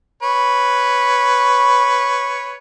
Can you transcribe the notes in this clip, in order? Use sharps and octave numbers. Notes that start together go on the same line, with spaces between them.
B4 C#5